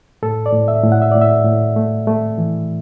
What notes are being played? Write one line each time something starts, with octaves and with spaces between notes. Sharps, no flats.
A2 A4
D5
A2
E5
A2
F#5
E5
A2 D5
E5
A2
A3
A3
E3